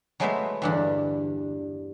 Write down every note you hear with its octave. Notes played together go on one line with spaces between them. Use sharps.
F#3 G#3 A3 B3 C5 E5
E2 G2 D3